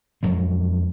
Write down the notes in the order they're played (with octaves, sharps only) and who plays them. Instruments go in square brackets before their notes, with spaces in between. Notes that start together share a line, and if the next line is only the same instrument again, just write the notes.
[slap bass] F2 F#3 G#3